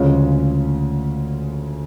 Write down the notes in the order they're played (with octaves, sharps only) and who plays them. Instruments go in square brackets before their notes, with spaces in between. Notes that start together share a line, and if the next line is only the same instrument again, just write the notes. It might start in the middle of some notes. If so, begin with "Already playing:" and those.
Already playing: [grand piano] D2 C#3 F3 G#3 C#4